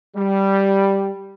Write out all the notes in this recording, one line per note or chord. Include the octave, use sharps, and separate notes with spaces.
G3